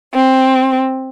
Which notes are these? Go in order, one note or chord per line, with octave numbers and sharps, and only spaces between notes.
C4